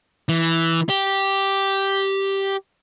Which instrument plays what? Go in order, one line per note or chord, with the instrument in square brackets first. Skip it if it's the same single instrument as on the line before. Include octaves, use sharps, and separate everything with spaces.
[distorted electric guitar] E3
G4